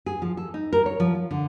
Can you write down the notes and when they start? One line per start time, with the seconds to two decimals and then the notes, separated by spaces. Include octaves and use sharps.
0.06 G#4
0.22 F3
0.37 A4
0.54 D#4
0.73 A#4
0.86 C#5
1.00 F3
1.15 F4
1.31 D3